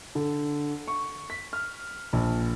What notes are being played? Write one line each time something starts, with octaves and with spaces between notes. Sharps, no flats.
D3
C#6
B6
F6
A#1